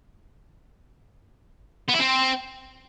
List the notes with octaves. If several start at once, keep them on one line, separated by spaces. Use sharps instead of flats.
B3
E4
C4